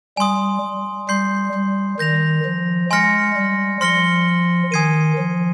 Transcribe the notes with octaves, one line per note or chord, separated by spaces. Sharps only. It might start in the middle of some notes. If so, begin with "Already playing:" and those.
G3 G#5 C6 D#6
G3 C6 G6 C7
G3
D#3 G6 A#6 F7
F3
G#3 G#5 C6 F6 A#6 C#7
G3
F3 C6 F6 A#6 C#7 G7
D#3 G#5 D#6 G#6 C7 D#7
F3